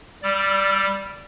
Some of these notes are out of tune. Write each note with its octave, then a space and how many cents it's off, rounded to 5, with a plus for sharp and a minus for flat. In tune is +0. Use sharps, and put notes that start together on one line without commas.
G3 +0 D5 -5 E6 +35